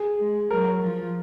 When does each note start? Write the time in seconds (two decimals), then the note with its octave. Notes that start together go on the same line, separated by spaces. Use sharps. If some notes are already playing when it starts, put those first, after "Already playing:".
Already playing: G#4
0.19 G#3
0.50 F#3 A#4
0.82 F3